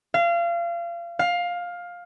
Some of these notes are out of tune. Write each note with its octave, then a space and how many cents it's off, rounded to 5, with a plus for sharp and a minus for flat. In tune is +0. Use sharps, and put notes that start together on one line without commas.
F5 -30
F5 +15